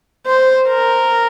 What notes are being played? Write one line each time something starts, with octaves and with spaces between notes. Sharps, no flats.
C5
A#4